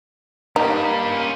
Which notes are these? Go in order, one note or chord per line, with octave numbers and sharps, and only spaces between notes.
G2 G3 A#3 D#4
C#4 F4